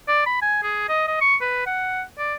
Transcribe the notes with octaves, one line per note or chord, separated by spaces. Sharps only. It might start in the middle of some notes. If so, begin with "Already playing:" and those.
D5
B5
G#5
G#4
D#5
D#5
C#6
B4
F#5
D5